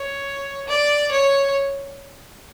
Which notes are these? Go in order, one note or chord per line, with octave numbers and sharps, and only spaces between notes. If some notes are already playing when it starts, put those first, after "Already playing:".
Already playing: C#5
D5
C#5